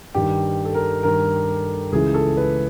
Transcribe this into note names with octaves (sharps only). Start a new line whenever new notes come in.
G2 D#3 G4
A4
A#4
G2 D#3 A#4
C#2 C#3 E3 G#4
A4
B4